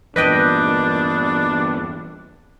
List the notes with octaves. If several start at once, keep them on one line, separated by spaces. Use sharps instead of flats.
E2 G2 A#2 D4 B4 D#5 G5